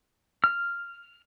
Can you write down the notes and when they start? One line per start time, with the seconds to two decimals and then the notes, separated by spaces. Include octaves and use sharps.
0.44 F6